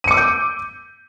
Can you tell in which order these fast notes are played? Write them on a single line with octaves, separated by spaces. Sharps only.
D#7 C#7 D6 E6 G6